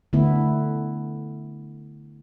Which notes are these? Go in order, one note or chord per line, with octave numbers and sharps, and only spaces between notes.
D3 A3 B3 E4